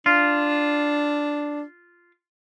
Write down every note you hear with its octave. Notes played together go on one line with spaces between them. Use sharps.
D4 F4